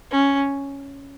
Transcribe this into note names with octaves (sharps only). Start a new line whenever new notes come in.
C#4